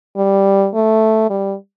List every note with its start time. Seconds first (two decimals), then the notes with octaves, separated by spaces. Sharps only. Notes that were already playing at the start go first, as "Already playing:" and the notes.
0.17 G3
0.74 A3
1.30 G3